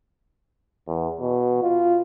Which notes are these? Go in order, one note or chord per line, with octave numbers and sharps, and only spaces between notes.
E2
B2
F4